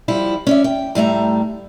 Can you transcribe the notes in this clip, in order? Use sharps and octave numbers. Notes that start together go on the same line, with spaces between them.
F3 G3 E4
C#4 D5 E5
G5
A2 G3 A3 A#5